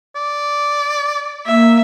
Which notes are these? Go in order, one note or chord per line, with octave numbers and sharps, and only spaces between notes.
D5
A#3 E5